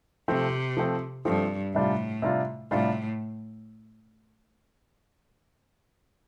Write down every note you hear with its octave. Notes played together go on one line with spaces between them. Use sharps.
C3 F3 A3 C4
F3 A3 C4
G2 F3 A3 C4
A2 C3 G3 D4 F4
C3 G3 D4 F4
A2 C3 G3 D4 F4